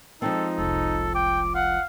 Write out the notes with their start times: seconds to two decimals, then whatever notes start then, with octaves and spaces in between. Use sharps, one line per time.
0.22 F3 G#3 C4 D#4 A4
0.58 F1 C2 A4
1.15 G5 D6
1.55 F5 F#5